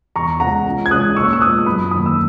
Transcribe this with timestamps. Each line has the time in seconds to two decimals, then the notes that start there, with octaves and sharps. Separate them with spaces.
0.16 E2 A#5 C#6
0.40 C#3 G#3 C#4 F#5 A#5
0.66 C#2
0.86 G#6
0.91 C#3 G#3 C#4 D#6 F#6
1.16 A#2 C#6 E6
1.33 E6
1.41 G#3 B3 D#6 F#6
1.66 F#2 B5 D#6
1.91 D#3 A#3 C#4 B5 D#6
2.06 E6